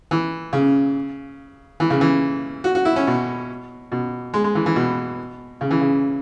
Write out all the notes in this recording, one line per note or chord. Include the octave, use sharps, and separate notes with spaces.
E3
C#3
E3
C#3
E3
F#4
F#4
E4
C#4
B2
B2
G#3
G#3
E3
E3
B2
C#3
E3
C#3